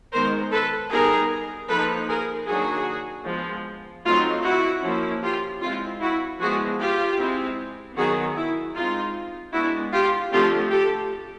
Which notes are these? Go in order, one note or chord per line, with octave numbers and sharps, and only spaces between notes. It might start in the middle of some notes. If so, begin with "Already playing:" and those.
D#3 G#3 B3 A#4 C5
A4 B4
G3 B3 D#4 G#4 A#4
F3 A#3 D#4 A4 B4
G#4 A#4
D#3 F#3 A#3 D4 F#4 G#4
F3 G#3 B3
F#3 A3 C4 D#4 F4
E4 F#4
F3 A#3 C#4 E4
F4 G4
G#3 C4 E4 F4
E4 F#4
F3 G#3 B3 E4 F#4 G#4
F4 G4
G#3 C4 E4
D#3 F#3 B3 F#4 G#4
E4
G#3 C4 D#4 F4
G#3 B3 D4 E4 F#4
F4 G4
D3 F3 A3 C4 F4 G4
G4 A4